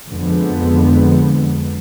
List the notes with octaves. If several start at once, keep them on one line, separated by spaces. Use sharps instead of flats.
F2 D3 F3 G#3 B3